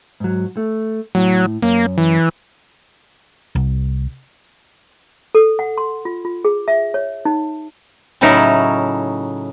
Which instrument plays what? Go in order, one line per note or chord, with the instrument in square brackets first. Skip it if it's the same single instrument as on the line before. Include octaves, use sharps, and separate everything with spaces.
[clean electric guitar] G#2 F#3
A3
[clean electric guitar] A2 [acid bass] F#3
[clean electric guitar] F#2 [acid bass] A#3
[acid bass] E3
[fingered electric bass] C2
[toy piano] A4
F#5
C6
F4
F4
G#4
E5
C#5
D#4
[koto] A2 C#3 F#3 C#4 D#4 E4